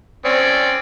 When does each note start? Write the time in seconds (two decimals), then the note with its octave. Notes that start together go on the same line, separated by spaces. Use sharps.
0.25 C4 C#4 D5